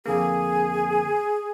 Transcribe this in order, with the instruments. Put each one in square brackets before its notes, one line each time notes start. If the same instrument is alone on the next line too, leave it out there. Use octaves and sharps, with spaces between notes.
[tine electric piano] F2 D3 A#3 [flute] G#4